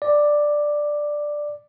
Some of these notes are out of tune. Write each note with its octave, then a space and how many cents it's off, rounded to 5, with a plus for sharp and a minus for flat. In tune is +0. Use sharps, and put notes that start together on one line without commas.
D5 +5